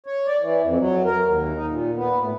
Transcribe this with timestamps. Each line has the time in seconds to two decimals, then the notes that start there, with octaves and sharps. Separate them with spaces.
0.06 C#5
0.27 D5
0.41 E3
0.63 F2
0.79 F#3
1.05 A#4
1.25 D#2
1.56 D#4
1.70 A#2
1.96 B3
2.19 A2